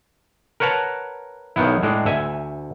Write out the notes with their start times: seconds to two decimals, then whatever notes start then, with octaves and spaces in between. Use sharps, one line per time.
0.60 A#4 B4 C#5 F#5 A5 A#5
1.56 B1 D#3 B3 E4
1.83 A2 G#3 D4
2.05 D2 E5 G#5